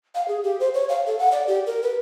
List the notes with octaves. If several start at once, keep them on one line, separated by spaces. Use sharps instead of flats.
F5
G#4
G4
C5
C#5
F5
A4
F#5
D5
G4
A#4
B4